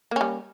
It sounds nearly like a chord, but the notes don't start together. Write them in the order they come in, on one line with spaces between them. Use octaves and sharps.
A#3 C#4 G3